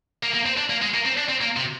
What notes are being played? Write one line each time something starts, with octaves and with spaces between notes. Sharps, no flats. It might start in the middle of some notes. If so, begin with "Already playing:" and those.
A#3
A#3
C4
D4
A#3
G#3
A#3
C4
D4
C4
A#3
C3